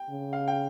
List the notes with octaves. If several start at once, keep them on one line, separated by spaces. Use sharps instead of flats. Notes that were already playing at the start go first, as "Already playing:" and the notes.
Already playing: G5
C#3
F5
G5